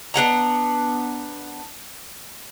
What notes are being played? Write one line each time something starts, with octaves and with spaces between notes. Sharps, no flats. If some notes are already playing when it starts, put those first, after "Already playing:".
B3 D4 F#5 A#5